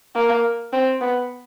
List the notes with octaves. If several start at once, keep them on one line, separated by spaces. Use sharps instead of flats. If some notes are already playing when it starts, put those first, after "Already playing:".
A#3
C4
B3